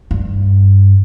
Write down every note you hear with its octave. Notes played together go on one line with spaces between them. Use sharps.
G2